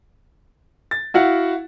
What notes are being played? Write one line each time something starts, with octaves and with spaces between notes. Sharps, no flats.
A6
E4 F#4 F5 F#5